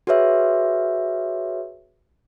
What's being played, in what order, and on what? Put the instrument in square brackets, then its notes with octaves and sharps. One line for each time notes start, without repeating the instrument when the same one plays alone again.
[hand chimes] F#4 G#4 B4 C#5 E5